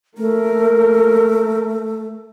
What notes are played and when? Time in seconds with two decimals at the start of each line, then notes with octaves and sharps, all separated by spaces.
0.18 A3 A#3 A#4